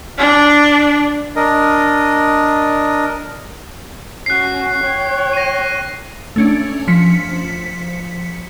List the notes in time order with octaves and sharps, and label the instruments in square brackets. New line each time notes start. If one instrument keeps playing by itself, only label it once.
[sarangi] D4
[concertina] D4 A#4 D#5
[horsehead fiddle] C#4 F#4 [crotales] F#6 C7
[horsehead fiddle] C#5 G5
[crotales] A#6 D#7
[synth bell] A3 C#4 D4
F3 B6 C#7